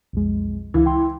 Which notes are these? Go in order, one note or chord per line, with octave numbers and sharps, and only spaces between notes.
B1 F2 G#3
C#2 E3 F5
G5 C6